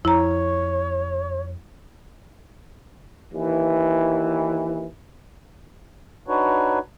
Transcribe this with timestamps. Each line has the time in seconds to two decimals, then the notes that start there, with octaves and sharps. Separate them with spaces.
0.05 F2 E4 C#5 A#5
3.33 D#2 E3
6.28 D4 D#4 F#4 B4 C#5